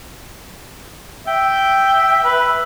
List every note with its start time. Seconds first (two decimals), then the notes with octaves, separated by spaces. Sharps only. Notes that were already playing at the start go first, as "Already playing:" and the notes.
1.27 E5 G5
2.24 B4